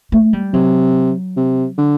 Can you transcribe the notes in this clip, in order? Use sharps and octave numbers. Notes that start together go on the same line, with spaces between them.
A3
G3
C3 F#3
C3
D3